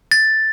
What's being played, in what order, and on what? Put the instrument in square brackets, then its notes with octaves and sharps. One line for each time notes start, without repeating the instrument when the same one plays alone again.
[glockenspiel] A6